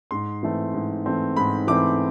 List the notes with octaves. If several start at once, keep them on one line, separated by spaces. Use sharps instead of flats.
G#2 C6
E3 A3 C4
G#2
E3 A3 C4
G#2 B5
E3 A3 C4 D6